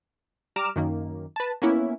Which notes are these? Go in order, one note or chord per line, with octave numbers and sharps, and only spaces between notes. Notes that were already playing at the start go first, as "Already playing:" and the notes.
G3 A#5 D6 F6 E7
F#2 D#3 A#3
B4 A5
A#3 B3 C#4 E4